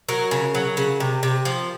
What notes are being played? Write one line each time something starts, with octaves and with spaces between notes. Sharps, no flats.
F#3 A#4
C#3
F#3
C#3
C3
C3
F3